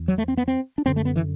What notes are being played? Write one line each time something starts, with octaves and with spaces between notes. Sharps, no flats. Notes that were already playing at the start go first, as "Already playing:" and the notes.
Already playing: E2
F#3
A3
C4
B3
C4
D4
F#2 D3 C4
A3
B3
E3